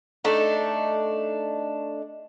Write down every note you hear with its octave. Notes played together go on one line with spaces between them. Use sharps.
A3 D4 D#4